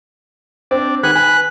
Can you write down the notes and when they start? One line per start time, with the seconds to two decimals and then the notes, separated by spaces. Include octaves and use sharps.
0.71 C4 D4
1.03 D#3 G#4 B4 F#5 F#6
1.15 B4 G#5